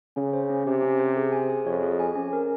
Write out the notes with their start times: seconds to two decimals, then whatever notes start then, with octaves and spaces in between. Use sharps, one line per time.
0.16 C#3 C#4
0.33 C5
0.50 C#4
0.67 C3 G4
0.82 C#4
0.99 C5
1.17 G#4
1.32 G#5
1.49 G#4
1.66 F2 C#5
1.82 G#4
2.00 G#5
2.15 C#4
2.33 A#4